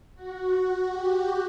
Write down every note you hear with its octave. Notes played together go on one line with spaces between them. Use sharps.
F#4
G4